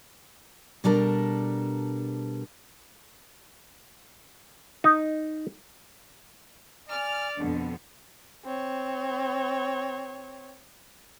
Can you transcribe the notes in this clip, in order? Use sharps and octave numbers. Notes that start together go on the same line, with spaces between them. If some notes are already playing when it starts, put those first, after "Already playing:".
B2 G3 D4 A4 A#4 A#5
D#4
D5 G#5 F6
F2 B2 D3 D4
C4 C#5